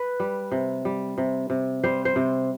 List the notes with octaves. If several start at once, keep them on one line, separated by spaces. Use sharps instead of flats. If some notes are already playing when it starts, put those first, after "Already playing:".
Already playing: B4
G3
C3
G3
C3
C3
G3 C5
C5
C3